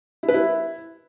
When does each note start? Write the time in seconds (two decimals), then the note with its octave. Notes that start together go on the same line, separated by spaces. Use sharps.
0.23 E4
0.29 B4
0.34 E4